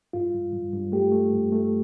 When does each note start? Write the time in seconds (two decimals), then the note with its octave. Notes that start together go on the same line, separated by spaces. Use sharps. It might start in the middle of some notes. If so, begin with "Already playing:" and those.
0.13 G2 F4
0.34 G2
0.53 G2
0.73 G2
0.92 A3 G4
1.12 A3
1.33 G2
1.52 A3